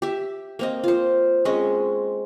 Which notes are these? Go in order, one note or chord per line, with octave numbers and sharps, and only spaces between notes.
G4 E5
A#3 C4 D#5
F4 C5
G#3 C4 C#4 D#5